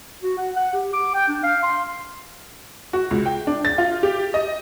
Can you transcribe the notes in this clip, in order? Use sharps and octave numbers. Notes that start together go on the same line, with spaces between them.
F#4
F#5
F#5
G4
D6
G5
D4
F5
C6
F#4
C#2
G5
D4
A6
F4
G4
D#5